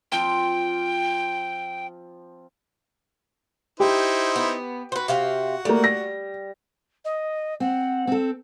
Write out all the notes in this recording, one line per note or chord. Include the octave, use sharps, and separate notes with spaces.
F3 C4 G5
D#4 E4 G4 C5
B3
F#4 B4 C5
C3 F5 G5
G3 A3 A#3
A#6
D#5
C4 F#5
C4 A4